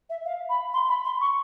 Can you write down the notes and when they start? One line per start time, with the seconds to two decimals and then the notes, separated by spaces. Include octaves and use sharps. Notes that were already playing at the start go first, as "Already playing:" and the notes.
0.09 E5
0.25 F5
0.49 B5
0.73 C6
0.88 B5
1.04 C6
1.20 C#6